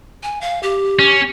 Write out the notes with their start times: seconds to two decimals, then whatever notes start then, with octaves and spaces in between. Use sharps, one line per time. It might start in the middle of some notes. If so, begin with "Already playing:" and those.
0.23 G#5
0.41 F5
0.63 G4
0.99 C#4